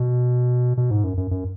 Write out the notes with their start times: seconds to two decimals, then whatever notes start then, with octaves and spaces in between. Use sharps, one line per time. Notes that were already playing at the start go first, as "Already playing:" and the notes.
Already playing: B2
0.77 B2
0.90 G#2
1.04 F#2
1.17 F#2
1.31 F#2